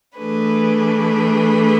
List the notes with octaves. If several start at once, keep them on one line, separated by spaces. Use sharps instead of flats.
E3 A3 D4 G#4 B4